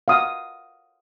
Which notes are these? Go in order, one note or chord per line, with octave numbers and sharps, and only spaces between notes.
F5 F#5 D#6